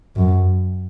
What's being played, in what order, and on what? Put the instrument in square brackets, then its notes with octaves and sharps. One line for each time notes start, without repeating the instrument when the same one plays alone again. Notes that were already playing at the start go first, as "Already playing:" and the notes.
[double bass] F#2